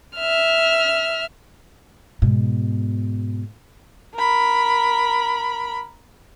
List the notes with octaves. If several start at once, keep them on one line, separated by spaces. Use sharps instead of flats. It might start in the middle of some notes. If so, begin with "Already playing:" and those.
E5 F6
G#2 B2
A#4 B5